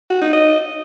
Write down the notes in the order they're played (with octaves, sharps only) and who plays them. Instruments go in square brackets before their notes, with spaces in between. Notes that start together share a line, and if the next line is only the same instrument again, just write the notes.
[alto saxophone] F#4
D#4
D#5